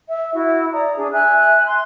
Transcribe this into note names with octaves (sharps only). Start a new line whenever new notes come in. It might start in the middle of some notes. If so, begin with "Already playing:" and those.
E5
E4 F#4
D5 A#5 D#6
D4 G#4
E5 G#5 F#6
C6